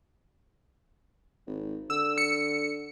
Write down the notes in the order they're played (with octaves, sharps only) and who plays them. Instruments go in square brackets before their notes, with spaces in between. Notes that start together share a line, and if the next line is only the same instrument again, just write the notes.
[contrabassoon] G#1
[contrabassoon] D3 [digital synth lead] E6
[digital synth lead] C#7